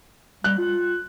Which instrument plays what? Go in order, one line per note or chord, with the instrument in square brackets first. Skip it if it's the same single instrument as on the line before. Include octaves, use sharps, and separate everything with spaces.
[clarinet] G3 [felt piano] F#6
[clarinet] F4